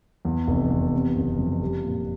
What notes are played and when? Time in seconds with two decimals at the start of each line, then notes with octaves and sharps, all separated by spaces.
0.25 E2
0.47 F1
0.70 E2
0.93 C3
1.15 F#1
1.39 F2
1.61 G3
1.84 A#2